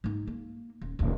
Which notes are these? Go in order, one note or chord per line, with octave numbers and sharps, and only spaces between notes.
G#2 D#4
A#3
D#1
D1 C2